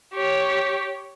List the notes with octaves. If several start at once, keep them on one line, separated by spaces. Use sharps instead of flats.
G4 C#5